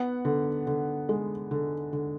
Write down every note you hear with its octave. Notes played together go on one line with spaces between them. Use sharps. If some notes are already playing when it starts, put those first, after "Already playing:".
Already playing: B3 F#5
D3
D3
G#3
D3
D3